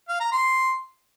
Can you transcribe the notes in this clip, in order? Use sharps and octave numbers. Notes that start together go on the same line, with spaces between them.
F5
A#5
C6